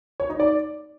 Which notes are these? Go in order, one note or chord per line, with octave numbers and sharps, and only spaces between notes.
C#5
D#4
D5